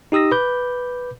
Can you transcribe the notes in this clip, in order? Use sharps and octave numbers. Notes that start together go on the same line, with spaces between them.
D#4 G4 D#6 E6 A#6
B4 B5 D6 G6